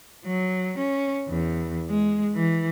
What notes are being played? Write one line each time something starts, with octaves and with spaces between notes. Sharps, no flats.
F#3
C#4
E2
G#3
E3